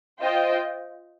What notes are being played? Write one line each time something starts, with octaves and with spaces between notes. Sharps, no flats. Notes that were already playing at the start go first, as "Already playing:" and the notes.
F4 C5 D#5 G5